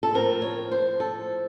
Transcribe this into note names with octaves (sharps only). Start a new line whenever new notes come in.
A4
A2 F3 C4 A#4
C#5
C5
A4